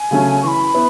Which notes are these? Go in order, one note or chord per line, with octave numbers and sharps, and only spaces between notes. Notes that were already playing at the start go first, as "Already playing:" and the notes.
Already playing: G#5
C#3 F#3 A3 C#4
E3 B5 C#6
B3 E4